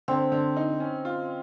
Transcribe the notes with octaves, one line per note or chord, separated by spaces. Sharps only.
D3 C4
D3
D#4
C#4
F4